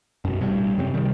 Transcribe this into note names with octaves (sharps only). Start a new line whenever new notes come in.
F#2 B2
A1 G2 B2 G3
F#2 C3 F#3 C4
C3 D#3 G3